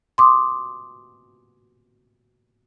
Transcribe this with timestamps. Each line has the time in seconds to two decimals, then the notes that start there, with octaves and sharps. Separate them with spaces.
0.18 C6 D6 D#6